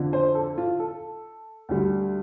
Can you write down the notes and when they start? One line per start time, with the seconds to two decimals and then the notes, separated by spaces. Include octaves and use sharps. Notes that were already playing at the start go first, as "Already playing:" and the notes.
Already playing: F2 D3 F3
0.13 C5
0.35 A4
0.58 F4
0.79 A4
1.69 D2 D3 G3